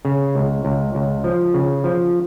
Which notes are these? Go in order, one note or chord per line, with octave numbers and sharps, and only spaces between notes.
C#3
C#2
C#2
C#2
F3
C#3
F3